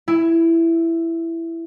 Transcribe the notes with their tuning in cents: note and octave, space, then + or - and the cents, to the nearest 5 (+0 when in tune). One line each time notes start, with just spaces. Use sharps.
E4 +10